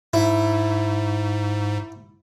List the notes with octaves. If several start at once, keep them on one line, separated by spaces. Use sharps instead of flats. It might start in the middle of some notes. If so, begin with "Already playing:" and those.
G#2 E4